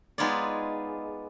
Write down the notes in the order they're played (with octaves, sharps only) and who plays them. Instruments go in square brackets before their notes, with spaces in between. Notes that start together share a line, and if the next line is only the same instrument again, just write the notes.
[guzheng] G#3 B3 D#4 F4 C#5 D5